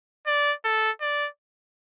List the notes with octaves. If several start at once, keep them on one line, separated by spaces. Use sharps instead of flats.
D5
A4
D5